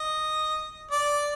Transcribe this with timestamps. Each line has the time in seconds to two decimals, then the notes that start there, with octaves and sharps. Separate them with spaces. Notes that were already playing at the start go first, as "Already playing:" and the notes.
Already playing: D#5
0.91 D5